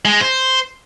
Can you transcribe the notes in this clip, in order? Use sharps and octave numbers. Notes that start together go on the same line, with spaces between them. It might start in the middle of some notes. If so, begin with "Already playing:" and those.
G#3
C5